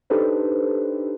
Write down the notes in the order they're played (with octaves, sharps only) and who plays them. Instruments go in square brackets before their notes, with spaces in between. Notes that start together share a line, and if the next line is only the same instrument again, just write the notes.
[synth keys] D4 D#4 G4 A4 B4 C5